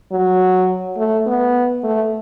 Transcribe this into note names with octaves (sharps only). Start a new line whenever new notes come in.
F#3
A3
B3
A3